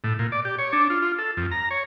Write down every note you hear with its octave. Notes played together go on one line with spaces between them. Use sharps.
A2
A#2
D5
G4
C#5
D4
F4
F4
A4
F2
A#5
C#5